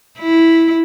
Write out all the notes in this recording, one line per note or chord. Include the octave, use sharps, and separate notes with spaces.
E4